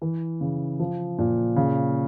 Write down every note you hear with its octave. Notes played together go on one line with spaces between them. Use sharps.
E3
C#3
F3
A#2
C#3